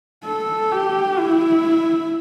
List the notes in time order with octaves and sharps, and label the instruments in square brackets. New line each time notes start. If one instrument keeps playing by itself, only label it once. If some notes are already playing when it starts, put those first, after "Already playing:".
[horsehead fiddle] A4
G4
E4